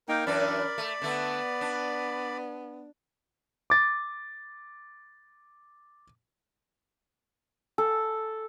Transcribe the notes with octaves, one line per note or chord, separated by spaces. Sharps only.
A#3 D#4 A#4 G5
F#2 E3 D4 D5 B5
A3
D3 A3 B3
D4
D6 A6
A4